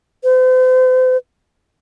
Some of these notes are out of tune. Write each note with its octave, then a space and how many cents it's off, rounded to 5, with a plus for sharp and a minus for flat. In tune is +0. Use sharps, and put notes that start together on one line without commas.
C5 -40